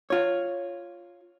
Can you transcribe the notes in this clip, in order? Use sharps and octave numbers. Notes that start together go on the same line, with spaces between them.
F4 C#5